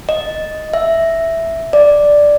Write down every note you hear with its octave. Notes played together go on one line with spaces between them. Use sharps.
D#5
E5
D5